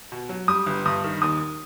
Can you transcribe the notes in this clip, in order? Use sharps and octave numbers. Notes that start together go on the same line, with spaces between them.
B2
F#3
G3 D#6
G1
G2 D#6
D#3
D#2 D#6